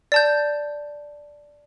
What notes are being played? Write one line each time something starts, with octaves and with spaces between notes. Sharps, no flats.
D5 A5 G6